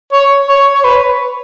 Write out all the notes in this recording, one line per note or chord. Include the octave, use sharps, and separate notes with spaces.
C#5
C#5
C#5
B4